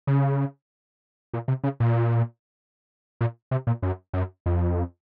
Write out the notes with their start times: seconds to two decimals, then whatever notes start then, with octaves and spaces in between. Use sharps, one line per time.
0.07 C#3
1.34 A#2
1.48 C3
1.64 C#3
1.80 A#2
3.21 A#2
3.51 C3
3.67 A#2
3.82 F#2
4.13 F#2
4.46 F2